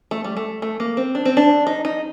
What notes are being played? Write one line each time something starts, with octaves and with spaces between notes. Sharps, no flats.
A3
G3
A3
A3
A#3
C4
D4
C4
D4
D#4
D#4